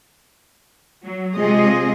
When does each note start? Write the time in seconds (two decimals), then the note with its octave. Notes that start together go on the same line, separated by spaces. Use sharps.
1.04 F#3
1.36 C3 G#3 F4 G#4 D#5